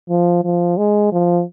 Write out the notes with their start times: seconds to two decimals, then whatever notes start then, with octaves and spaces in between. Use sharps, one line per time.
0.10 F3
0.44 F3
0.78 G#3
1.12 F3